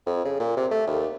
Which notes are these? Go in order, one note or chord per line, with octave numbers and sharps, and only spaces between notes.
F2
C#3
A#2
C3
A3
D#2